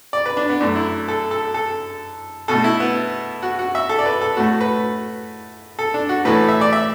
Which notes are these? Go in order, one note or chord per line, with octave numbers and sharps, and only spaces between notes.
D5
B4
D4
B3
F#2 F#3 A3 D4
E4
A4
A4
A4
B2 A3 A4
E4
B3
F#4
F#4
E5
A4
D5
B4
A4
A2 A3 F#4
B4
A4
D4
F#4
A2 E3 A3 B4
E5
D5
E5